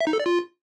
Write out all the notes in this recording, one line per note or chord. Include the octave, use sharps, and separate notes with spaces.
E5
D#4
A4
D5
F4